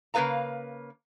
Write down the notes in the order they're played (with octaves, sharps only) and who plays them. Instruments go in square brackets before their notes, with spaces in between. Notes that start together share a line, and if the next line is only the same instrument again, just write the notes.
[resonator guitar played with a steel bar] C#3 A#3 F4 B4 F5 A#5